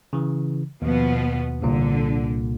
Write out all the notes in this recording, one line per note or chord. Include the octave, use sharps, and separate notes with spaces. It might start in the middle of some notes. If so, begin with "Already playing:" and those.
C#3 E3
D#2 B2 F3 B3
C2 A#2 D3